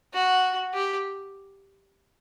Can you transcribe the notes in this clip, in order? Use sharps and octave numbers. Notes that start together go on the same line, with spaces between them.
F#4
G4